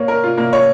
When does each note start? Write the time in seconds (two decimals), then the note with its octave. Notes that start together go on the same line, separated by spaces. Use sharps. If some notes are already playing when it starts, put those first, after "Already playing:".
Already playing: A#3 C#5
0.08 A#4
0.24 F4
0.38 A#3
0.53 C#5